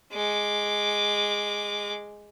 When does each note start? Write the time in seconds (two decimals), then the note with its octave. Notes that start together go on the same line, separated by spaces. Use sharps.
0.13 G#3 D6